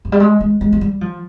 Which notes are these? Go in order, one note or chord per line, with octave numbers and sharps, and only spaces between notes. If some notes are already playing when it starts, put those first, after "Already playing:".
F3
G3
G#3
G#3
G#3
F3
G3
F3